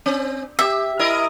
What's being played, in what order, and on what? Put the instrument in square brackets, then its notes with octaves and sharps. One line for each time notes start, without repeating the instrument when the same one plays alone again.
[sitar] C4
[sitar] G4 [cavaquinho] E5
[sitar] E4 A#4 D#5